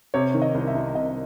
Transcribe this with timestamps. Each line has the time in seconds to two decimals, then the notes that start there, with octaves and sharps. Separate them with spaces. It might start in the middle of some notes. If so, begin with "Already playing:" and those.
0.14 C3 C#5
0.34 D#3
0.42 D#5
0.55 C2
0.67 E5
0.75 C2
0.94 C3 D#5